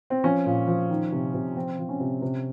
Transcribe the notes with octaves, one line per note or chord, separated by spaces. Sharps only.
C4
F3 C#4
A#2
F3
D#3
C3
C3
F3 C4
F3
C#4
C3
C3